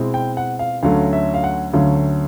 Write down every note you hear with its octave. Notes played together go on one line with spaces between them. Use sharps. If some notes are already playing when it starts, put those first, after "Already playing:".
Already playing: B2 G#3 C4 E4
G5
F#5
F5
D2 D3 F#3 A3 C#4 F5
E5
F5
F#5
D2 D3 F#3 A3 C#4 F5